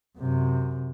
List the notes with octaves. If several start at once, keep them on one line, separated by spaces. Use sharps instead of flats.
F#2 C3